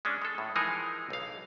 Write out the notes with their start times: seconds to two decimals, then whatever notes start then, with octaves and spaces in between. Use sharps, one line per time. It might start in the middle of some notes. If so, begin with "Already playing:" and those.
0.05 G#3 C#4 D4
0.22 G#3 A4
0.38 A2
0.56 E3 F3 G#3 D#4 G#4 A#4
1.10 B1 F5